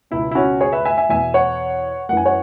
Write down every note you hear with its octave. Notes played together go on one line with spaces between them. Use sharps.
C#2 B2 E4
E4
C#4 F#4
G#4 C#5
B4 E5
E5 G#5
E5 G#5
E2 B2 E5 G#5
C#5 F#5
F#2 E3 F#5 G#5
C#5 F#5